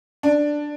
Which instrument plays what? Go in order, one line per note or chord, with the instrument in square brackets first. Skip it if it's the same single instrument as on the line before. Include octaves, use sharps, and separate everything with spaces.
[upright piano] D4